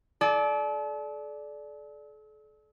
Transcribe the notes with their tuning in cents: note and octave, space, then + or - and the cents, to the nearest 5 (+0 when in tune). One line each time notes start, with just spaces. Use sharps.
A4 -40 D5 +0